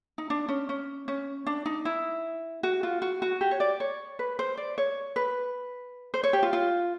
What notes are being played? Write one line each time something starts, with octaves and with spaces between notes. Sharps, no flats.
D#4
D4
C#4
C#4
C#4
D4
D#4
E4
F#4
F4
F#4
F#4
G4
C#5
D5
C#5
B4
C5
D5
C#5
B4
C5
C#5
G4
F4
F4